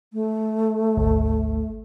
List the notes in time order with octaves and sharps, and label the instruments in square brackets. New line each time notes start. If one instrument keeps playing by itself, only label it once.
[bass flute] A3
[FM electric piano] G#1 D2